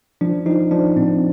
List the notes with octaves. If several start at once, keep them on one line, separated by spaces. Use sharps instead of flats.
F3 D4
F3 D#4
F3 D4
A2 C4